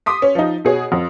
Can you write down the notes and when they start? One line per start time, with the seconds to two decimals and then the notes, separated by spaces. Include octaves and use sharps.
0.06 C6 D6 D#6 B6
0.22 C#4
0.35 F3 D#4
0.65 B2 G#4 C#5
0.92 F2